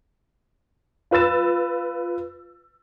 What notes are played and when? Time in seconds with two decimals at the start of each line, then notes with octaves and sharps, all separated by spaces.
1.11 F4 B4 E6 A6 E7